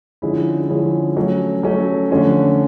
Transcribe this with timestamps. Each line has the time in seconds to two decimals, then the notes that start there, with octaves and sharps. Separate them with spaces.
0.22 D3 F3 G#3 C#4 E4
0.70 D3 F3 G#3 C#4 E4
1.16 F#3 A3 C#4
1.63 F#3 A3 C#4
2.10 D3 F3 A3 C#4 F4